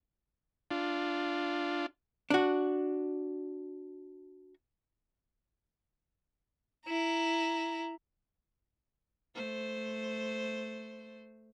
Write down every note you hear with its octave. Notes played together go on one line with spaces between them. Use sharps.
D4 F4
D4 F#4
E4 A#5
A3 C5